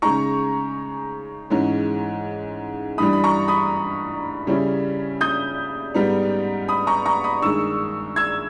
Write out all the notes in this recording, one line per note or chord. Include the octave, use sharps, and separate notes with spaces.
C#3 G#3 D#4 A#5 C#6
G#2 E3 G#3 C#4
G2 E3 G3 B5 D#6
B5
A#5 C#6
B5 D#6
C#3 G3 C#4 E4
D#6 G6
G#2 G3 B3 D#4
B5 D#6
A#5 C#6
A#5 C#6
B5 D#6
G2 D#3 G#3 C#6 E6
E6 G#6